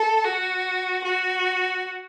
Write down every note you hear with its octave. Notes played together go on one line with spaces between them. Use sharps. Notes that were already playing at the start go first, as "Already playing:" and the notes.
Already playing: A4
F#4
F#4